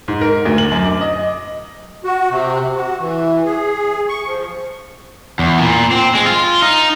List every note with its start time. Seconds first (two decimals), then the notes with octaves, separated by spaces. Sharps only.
0.08 G#2
0.21 A#4
0.45 D2
0.58 F#7
0.72 F#2
0.85 D6
1.01 D#5
2.04 F#4
2.30 C3
2.76 F#4
3.00 E3
3.45 G#4
4.09 C#6
4.27 F3
5.39 E2
5.59 A#2
5.92 C4
6.15 G#3
6.27 F4
6.62 D#4